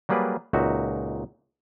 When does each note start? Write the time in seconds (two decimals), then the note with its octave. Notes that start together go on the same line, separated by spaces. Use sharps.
0.09 F#3 G3 A#3 G#4 B4 D5
0.53 C#2 A#2 D#4 F#4 E5